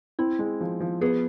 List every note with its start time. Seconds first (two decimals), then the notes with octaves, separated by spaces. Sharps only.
0.19 C4 E4
0.39 G#3
0.61 F3
0.81 F3
1.01 B3 G#4